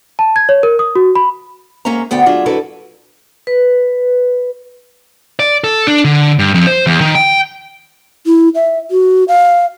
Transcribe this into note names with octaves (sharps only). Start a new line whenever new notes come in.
A5
G#6
C#5
A#4
D#6
F#4
B5
G#2 A#3 C#4 A#4 E5 A#5
D2 B3 D5 F#5 G5
F#3 D4 F4 G#4 E5
F2 D3 F#3 E4 A4 B4
B4
D5
A4
D4
D3
G2
F2
C5
E2
D#3
G5
E4
E5
F#4
F5